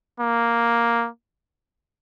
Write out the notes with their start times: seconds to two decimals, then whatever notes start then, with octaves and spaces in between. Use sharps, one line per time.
0.20 A#3